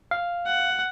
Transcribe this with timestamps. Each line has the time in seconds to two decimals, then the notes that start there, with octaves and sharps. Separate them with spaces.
0.11 F5
0.46 F#5